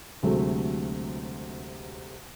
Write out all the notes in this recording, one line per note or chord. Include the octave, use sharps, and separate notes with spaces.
D2 C3 F#3 G#3 A3